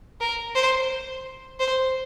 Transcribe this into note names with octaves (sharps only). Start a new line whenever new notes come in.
A#4
C5
C5